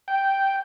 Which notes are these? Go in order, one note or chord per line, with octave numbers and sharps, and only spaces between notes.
G5